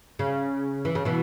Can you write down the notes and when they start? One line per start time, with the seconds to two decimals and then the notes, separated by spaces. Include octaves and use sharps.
0.19 C#3
0.85 E3
0.95 C#3
1.05 B2 E3